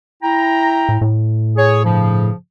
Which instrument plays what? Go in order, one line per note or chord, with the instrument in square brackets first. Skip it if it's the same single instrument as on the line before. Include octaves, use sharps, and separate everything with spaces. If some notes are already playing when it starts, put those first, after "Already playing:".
[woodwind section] E4 G5 A#5
[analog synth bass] A2
A2
[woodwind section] G#4 C#5
G2 C#3 F3